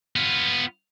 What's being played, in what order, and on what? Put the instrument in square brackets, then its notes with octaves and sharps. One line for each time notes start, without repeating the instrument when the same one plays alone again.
[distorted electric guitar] B3 F4